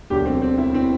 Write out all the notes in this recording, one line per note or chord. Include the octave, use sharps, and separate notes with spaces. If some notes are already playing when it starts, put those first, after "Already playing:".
E1 D2 D3 F#3 G4
C4
C4
E4
C4